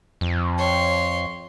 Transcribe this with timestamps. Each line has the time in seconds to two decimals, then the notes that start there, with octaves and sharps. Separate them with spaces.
0.21 F2
0.58 C#5 C6